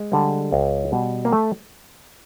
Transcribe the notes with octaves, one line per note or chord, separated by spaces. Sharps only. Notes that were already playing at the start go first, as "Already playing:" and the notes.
Already playing: G#3
D3 G3
C#2
B2 G3
A#3
A3